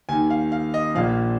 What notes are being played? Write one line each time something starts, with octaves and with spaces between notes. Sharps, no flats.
D#2 D#3 G#5
F5
F5
D#5
A#1 A#2 F3 F5